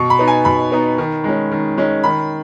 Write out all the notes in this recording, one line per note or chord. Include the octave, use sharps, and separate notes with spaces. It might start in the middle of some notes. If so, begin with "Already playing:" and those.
Already playing: B2 C#6
B5
B3 D#4
G#5
B2 B5
B3 D#4
D#3
G#3 C#4
D#3
G#3 C#4
D#3 B5